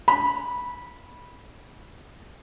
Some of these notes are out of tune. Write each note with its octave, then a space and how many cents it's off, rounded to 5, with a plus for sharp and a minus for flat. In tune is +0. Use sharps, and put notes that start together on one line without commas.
B5 -15